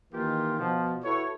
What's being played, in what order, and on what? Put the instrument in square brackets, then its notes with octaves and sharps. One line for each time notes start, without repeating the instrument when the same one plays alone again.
[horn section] D#3 E3 A#3 D#4 F4 G4
B2 F3
E4 F#4 A4 B4 C#5